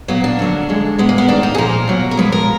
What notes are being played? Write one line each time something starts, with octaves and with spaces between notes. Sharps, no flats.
A#2 F#3 A#3 B3
D4
F2 D3 F#3 A#3
F2 D3 G#3
A#2 G#3 B3
A#3
B3
G#2 D#3 A#3 D4
D#4
G#4
A#2 F3 A#3 A#4
B2 F#3 A#3
A#4
A#2 F3 G#3 B4
A#4